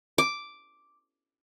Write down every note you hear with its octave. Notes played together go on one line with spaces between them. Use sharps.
D6